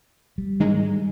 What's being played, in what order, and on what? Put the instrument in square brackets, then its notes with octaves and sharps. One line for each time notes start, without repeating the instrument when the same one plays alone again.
[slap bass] G3
[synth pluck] G#2 D#3 G#3 D#4